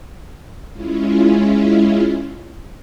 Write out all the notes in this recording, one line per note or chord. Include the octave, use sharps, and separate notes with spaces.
G#3 C#4 E4 F4